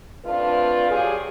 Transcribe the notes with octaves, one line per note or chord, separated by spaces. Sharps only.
A3 C4 D4 F4 B4
F#3 G4 G#4